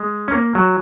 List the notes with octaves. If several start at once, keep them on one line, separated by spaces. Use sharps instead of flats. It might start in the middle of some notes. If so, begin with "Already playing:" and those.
Already playing: G#3
C#4
A#3
F#3